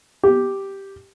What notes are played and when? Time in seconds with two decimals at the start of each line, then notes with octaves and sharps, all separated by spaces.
0.23 G4